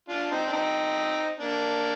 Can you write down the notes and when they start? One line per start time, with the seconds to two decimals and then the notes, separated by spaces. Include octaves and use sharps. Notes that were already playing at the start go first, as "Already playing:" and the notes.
0.09 D4 F4
0.31 C4 D#4
0.48 D4
0.53 C4 D#4
1.40 A#3 D4